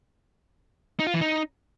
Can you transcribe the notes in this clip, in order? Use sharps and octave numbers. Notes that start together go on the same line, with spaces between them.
D#4
F4
E3
D#4